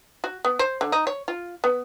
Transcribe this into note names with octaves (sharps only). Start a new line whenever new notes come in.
F#4
B3
C5
D3
D#4
C#5
F4
B3